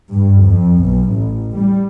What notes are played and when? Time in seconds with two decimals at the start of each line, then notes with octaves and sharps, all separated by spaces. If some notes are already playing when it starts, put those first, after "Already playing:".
0.11 G2
0.43 F2
0.81 B1
1.12 A1
1.54 G3